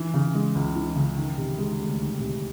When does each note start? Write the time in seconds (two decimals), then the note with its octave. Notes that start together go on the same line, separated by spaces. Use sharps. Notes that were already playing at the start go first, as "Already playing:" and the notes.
Already playing: E3
0.14 C#3
0.34 G#3
0.55 C#2
0.76 E3
0.96 C#3
1.16 D#3
1.38 C3
1.58 G#3
1.79 D2
1.99 D#3
2.20 C3